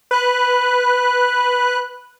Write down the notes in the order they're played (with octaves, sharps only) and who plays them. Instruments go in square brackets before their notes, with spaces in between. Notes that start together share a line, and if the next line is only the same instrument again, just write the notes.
[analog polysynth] B4 F#6